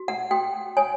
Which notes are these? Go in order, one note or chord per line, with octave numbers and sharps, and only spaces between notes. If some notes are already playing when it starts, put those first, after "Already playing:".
Already playing: F#4
F#5
F#4 G5
C#5 G#5